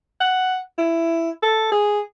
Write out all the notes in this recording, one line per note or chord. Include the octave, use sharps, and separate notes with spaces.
F#5
E4
A4
G#4